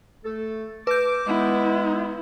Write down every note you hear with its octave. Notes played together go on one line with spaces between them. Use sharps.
A3 A4
B4 D6 G6
G#3 B3 E4